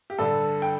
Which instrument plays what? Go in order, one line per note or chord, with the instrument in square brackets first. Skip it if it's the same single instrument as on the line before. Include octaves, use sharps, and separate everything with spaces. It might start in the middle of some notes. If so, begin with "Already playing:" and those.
[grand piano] G4
G2 D3 A4
G5